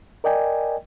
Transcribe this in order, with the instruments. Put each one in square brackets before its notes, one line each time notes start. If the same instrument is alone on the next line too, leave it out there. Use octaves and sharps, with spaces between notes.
[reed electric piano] A#4 D5 D#5 G5 G#5